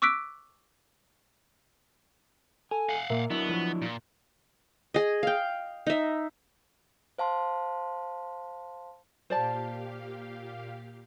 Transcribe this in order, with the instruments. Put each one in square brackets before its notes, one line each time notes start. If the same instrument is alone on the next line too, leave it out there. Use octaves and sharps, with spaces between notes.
[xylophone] C#6 D6 E6 F#6 B6 D7
[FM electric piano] A4 [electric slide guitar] G#5
[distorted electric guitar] F5 F#5
[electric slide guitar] A#2 A#3 [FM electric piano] A#4 E5
[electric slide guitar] F#3 D4 E4 [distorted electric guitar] B3
[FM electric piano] F3
[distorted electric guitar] A#2
[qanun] G#4 D#5
F5 G5
D#4 E5
[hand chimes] C5 F5 A5 C6
[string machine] A#2 G4 F5 [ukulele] C5 D5 A5